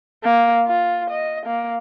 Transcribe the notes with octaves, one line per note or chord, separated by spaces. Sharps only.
A#3
F4
D#5
A#3